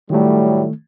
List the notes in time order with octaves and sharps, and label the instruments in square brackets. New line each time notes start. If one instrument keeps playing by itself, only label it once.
[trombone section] A2 F#3 G3 [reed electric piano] D#3 A3